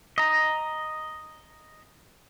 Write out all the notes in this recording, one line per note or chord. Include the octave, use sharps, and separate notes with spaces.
D#5 A#5